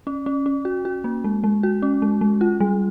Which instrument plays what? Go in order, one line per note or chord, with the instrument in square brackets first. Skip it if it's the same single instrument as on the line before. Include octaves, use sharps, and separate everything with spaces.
[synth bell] C#4
C#4
C#4
F#4
F#4
A#3
G#3
G#3
F#4
C#4
G#3
G#3
F4
G3